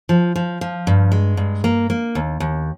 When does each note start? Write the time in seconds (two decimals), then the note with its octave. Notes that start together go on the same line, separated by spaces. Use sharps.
0.09 F3
0.36 F3
0.61 F3
0.87 G2
1.12 G#3
1.37 G2
1.64 A#3
1.90 A#3
2.15 D#2
2.40 D#2